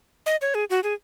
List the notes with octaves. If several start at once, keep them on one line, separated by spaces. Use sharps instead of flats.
D#5
C#5
G#4
F#4
G#4